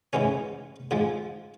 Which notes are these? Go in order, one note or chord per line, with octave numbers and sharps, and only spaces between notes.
G#2 E3 G#3 C#4
G#2 F3 G#3